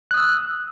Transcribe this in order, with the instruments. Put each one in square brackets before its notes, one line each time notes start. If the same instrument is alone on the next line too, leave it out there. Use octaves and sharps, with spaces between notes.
[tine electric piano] F#6
D#6
E6